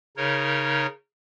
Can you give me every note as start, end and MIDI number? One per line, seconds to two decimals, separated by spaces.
0.17 0.87 49
0.17 0.87 63
0.17 0.87 70
0.17 0.87 73